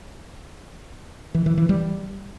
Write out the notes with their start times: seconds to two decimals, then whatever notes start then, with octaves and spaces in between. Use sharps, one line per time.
1.35 E3
1.46 E3
1.58 E3
1.69 G3